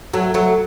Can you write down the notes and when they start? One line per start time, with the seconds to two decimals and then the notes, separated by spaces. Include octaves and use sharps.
0.13 F#3 A3
0.34 F#3 A3